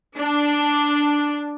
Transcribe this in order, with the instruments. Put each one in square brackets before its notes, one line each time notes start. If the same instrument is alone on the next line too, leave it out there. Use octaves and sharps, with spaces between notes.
[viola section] D4